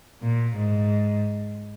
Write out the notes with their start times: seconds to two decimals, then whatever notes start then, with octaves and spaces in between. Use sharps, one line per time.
0.22 A#2
0.57 G#2